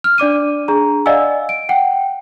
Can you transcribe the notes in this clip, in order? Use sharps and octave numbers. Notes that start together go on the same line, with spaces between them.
F6
D4 D5 D6 D#7
D4 G#4 A#5
D5 D#5 F5 F#5 G#5 E6
D7
F#5 G5